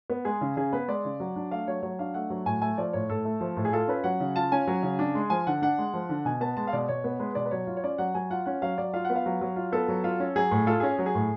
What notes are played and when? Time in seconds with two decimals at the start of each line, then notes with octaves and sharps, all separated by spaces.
0.10 B3
0.25 G#3 G#4
0.41 C#3
0.57 C#3 G#4
0.73 B3 B4
0.88 G#3 D5
1.05 C#3
1.20 F#3
1.36 D4
1.51 A3 F5
1.67 F#3 C#5
1.83 F#3 C#5
1.99 D4 F5
2.14 A3 F#5
2.30 F#3
2.46 A2 G#5
2.62 A3 G#5
2.78 F3 D5
2.93 A2 C#5
3.10 A2 A4
3.25 A3
3.41 F3
3.57 A2
3.65 G#4
3.73 F4 A4
3.88 C#4 B4
4.04 F#3 F#5
4.20 C#3
4.36 F4 A5
4.52 C#4 G#5
4.67 F#3
4.83 C#3
4.99 D4
5.15 G#3
5.30 F3 G#5
5.47 D3 F#5
5.62 D4 F#5
5.78 G#3
5.94 F3
6.09 D3
6.25 B2 G#5
6.41 B3 A5
6.57 G#3 A5
6.67 F5
6.73 B2 D5
6.88 B2 C#5
7.04 B3
7.20 G#3 B4
7.35 B2 D5
7.45 B4
7.51 F#3 C#5
7.67 F4
7.77 C#5
7.84 C#4 D5
7.98 F#3 F#5
8.15 F#3 G#5
8.30 F4 F#5
8.46 C#4 F#5
8.62 F#3 F5
8.78 F#3 D5
8.94 F4 F5
9.05 F#5
9.10 B3
9.16 F5
9.26 F#3
9.41 F#3
9.56 F4
9.72 B3 A4
9.88 F#3
10.04 F4
10.20 C#4
10.36 F#3 G#4
10.51 A2
10.67 F4 A4
10.80 C#4 G#4
10.99 F#3
11.06 G#4
11.15 A2